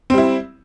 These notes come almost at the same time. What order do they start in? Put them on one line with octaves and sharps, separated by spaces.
C4 G3 E4